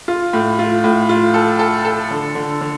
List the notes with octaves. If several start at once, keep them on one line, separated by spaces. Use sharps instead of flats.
F4
A2
F4
A2
F4
A4
A4
A4
D3
D3
D3